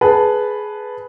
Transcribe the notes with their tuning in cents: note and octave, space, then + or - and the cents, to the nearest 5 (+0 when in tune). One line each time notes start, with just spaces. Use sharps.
G#4 +15 B4 +0 A5 +0